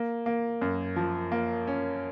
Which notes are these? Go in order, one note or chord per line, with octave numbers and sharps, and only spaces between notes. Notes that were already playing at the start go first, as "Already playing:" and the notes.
Already playing: A#3
A#3
F#2
F3
A#3
C#4